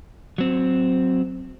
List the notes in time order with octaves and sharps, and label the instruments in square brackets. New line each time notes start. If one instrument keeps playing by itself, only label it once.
[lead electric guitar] F#3 C4